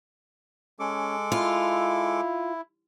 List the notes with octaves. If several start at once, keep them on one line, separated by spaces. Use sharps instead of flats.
G#3 C#4 A4 D6
E4 F4